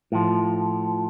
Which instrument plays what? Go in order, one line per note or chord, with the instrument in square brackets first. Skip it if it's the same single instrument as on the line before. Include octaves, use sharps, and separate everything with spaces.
[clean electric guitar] A2 F3